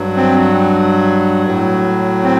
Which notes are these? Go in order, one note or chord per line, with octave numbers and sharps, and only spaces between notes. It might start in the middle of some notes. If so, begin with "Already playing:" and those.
Already playing: G2 F#3
C4
A2 F#3
C4